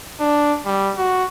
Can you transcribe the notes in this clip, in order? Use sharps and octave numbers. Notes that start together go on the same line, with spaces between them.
D4
G3
F#4